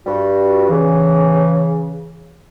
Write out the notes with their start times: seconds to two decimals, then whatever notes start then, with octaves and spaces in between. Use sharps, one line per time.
0.06 G2 G3 F#4
0.69 C#3 E3